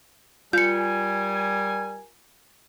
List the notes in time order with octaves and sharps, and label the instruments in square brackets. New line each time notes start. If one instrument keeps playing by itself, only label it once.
[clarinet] G3 [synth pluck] F4 [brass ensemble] G4 A#4 G#5 [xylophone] G6 C#7